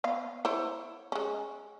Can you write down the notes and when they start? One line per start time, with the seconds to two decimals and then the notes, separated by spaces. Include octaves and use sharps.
0.04 B3 F5
0.45 E4 C5 C#5
1.12 G#3 C#4